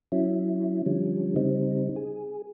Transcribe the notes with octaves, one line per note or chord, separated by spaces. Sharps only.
F#3 C#4 E4
D3 F3 G3 C#4
C#3 G3 C4 D#4
G#4